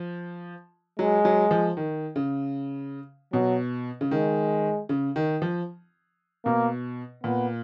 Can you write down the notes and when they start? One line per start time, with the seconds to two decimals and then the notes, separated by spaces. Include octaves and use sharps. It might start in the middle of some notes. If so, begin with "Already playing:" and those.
Already playing: F3
0.99 F#3 G#3
1.25 F#3
1.51 F3
1.77 D#3
2.16 C#3
3.33 B2 F#3
4.01 C#3
4.11 D#3 G#3
4.89 C#3
5.16 D#3
5.42 F3
6.45 B2 A#3
7.23 A#2 B3